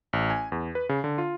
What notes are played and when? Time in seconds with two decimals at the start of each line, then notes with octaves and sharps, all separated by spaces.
0.13 A1
0.30 G#5
0.52 E2
0.75 B4
0.89 C#3
1.04 D3
1.18 F4